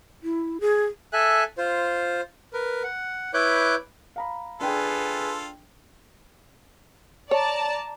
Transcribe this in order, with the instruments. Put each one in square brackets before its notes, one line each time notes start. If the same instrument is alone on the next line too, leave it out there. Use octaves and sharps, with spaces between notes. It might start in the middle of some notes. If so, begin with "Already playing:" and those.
[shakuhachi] E4
G#4
[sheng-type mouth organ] A4 E5 G#5 F#6
F4 C5
A#4 B4
F#5
E4 B4 C#5 D6 F#6 G6
[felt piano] F5 A#5 B5
[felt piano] D4 G5 [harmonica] F4 A4 [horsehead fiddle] G#4 B4
[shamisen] C#5 [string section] D5 A5 A#5